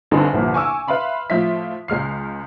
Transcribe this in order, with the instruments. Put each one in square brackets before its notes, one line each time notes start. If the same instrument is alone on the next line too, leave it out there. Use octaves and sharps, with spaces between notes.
[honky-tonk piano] G1 G2 D3 C4 D#4 G#5
G1 C2 A#2 F3
G#5 C#6 D6 E6
B4 E5 F5 B5 C6
A2 F3 F4 E5 B6
C#2 G#3 F6 C7